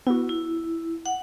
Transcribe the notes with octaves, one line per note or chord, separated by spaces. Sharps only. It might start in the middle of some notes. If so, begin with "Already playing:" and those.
B3 E4 F#4
E4
F#5